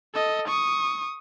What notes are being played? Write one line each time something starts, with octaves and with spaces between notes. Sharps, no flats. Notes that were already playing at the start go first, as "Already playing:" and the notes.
A4 D#5
C#6 D#6